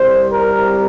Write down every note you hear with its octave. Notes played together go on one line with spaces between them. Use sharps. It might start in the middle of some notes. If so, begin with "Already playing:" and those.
Already playing: C2 C3 G3 C5
A#4